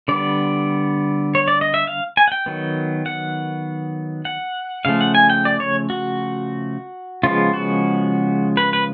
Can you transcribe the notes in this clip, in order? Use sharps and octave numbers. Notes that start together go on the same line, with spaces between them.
D3 G3 B3 D5
C#5
D5
D#5
E5
F5
G#5
F#5
G5
D#3 F#3 B3
F#5
F#5
C#3 F3 A3 F5
F#5
G#5
G5
D5
C#5
F#4
C#3 F3 G#3 B3 F4
F#4
B4
B4